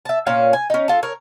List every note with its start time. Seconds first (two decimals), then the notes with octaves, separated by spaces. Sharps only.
0.05 E5 A5
0.26 A#2 C#4 C#5 F5
0.53 G#5
0.70 C#4 D#4
0.88 F4 A4
1.03 A#4 C#5